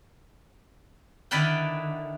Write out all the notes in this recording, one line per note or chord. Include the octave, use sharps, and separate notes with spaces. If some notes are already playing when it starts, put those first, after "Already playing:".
D3 D#3 E4 B4 D5 G5